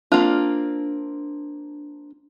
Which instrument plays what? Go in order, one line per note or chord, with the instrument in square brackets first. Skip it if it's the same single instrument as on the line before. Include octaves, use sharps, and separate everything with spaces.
[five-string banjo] A#3 C4 F4 [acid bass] D4